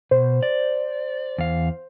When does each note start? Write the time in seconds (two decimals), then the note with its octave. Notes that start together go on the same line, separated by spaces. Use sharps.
0.11 B2 C5
0.43 D5
1.38 E2 F5